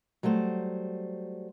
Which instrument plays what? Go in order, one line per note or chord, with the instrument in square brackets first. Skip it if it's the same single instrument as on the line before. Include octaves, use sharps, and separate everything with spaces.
[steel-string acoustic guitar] F#3 G3 A3 C5